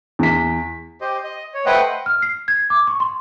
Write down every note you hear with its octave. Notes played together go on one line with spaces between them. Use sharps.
E2 B6
G4 C5 D#5
D#5
C#5
A3 B4 C5 D#5 F#5 G5
F6
C7
G#6
D6
C#6
C6